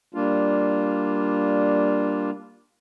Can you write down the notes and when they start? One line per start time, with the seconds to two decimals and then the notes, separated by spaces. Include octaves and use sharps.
0.14 G3 A#3 D4 F4